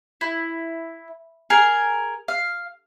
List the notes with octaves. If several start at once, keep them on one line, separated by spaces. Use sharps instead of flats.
E4
G#4 A#4
F5